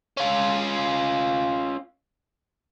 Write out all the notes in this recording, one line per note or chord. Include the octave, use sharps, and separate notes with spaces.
C#4 F4